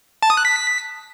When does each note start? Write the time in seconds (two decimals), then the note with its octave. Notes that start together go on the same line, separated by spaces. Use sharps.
0.23 A5
0.30 D#6
0.37 F#6
0.45 B6